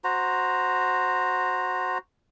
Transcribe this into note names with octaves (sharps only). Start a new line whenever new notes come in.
F#4 C5 A#5